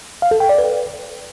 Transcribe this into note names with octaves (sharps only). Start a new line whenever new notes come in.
F5
A4
G5
D5
B4